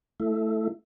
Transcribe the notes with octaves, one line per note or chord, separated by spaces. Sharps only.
A3 E4